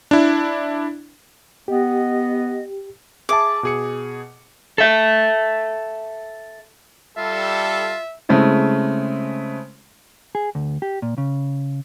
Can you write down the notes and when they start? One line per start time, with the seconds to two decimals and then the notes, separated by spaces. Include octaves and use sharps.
0.11 D4 E4
1.68 B3 G4 D#5
3.29 G#4 E5 A5 D6
3.63 B2 G#4 C#7
4.78 A4 E5
7.17 G3 F4 A4 E5
8.29 C#3 G#3 A3 C4 E4
10.35 G#4
10.55 D2
10.82 G4
11.02 A#2
11.18 C#3